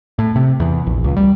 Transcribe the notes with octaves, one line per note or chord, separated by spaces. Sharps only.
A2
C3
E2
A#1
C#2
G3